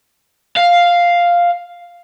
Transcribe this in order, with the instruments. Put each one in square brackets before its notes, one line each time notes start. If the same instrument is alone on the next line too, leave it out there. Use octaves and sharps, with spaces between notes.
[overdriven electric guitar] F5